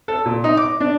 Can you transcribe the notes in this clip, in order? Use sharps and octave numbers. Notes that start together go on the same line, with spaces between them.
A4
A#2
D#4
D6
D4